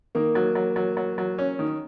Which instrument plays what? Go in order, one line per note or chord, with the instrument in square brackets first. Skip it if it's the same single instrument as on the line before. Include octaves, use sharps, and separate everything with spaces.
[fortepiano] D#3 [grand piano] A#3
[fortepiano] F#3
F#3
F#3
F#3
F#3
C#4
D#3